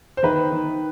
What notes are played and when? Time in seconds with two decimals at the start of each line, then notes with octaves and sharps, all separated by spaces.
0.17 C5
0.23 D#3 B4
0.52 D#3